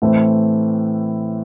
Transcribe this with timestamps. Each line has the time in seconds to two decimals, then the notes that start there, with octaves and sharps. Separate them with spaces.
0.02 A2 E3 A3 C4